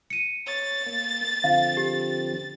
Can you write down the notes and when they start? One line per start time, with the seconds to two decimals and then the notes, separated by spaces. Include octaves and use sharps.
0.10 C#7 D#7
0.47 C#5 A6
0.87 A#3
1.44 D3 F3 C4 F5
1.77 G4